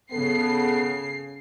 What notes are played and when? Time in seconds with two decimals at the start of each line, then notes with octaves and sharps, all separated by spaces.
0.11 C#3 B3 A4 C7